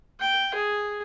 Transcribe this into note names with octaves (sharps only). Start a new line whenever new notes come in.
G5
G#4